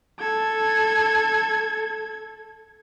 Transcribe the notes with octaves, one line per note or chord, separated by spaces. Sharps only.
A4 G#6